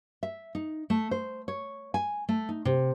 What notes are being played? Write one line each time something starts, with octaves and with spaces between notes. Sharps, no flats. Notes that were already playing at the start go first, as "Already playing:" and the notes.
E5
D#4
A3
C5
C#5
G#5
A3
D#4
C3